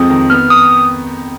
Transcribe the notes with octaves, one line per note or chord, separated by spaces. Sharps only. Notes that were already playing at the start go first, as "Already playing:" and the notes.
Already playing: F2 G#3 C4 D#6
D#3
B3 F6
D#6